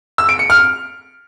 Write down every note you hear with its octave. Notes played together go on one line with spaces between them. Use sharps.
E6
D7
C#7
F6